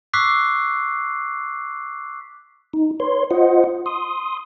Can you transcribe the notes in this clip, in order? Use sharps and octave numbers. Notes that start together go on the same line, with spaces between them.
C#6 D6 E6 F#6 B6 C7
D#4
B4 C#5 C6
F4 C5 D#5 F#5
C6 D#6